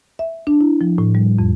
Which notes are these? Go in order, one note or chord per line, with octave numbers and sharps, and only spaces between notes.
E5
D4
E4
F3
A2
G3
F2